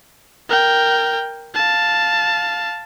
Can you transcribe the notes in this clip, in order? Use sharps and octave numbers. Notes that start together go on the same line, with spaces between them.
A#4 G5
F5 A5